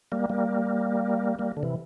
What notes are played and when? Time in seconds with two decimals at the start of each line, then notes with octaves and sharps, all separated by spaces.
0.12 G3 A#3
0.30 G3 A#3
1.39 G3 A#3
1.57 D3
1.63 C3 E3